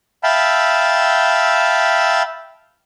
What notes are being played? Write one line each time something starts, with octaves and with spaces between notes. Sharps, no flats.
E5 F5 G5 A5 B5 E6